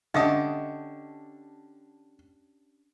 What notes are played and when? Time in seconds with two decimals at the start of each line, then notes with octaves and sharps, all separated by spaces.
0.14 D3 C#4 D4 G4 D#5 E5 D#6